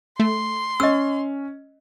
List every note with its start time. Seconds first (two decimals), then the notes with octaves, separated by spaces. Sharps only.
0.20 A3 C6
0.80 C#4 D#5 E6